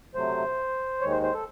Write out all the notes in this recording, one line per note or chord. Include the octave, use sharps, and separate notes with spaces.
C3 F#3 A3 C5
D#2 D#3 G#3 C#5
C5
C5
A4